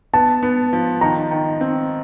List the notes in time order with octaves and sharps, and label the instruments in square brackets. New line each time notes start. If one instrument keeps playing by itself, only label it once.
[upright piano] B3 [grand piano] A5
[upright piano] B3
F3
[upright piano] D#3 [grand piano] A#5
[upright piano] D#3
C4